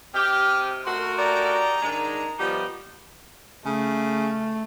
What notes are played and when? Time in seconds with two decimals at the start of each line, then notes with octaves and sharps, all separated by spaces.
0.15 C3 C4 G4 D#5 F6
0.85 A3 F#4 A#4 C6
1.17 D#4 G4 D5 A#5
1.82 G#2 D#3 G#3 D4
2.38 F3 G3 B3 D#4 G4
3.66 C#3 A3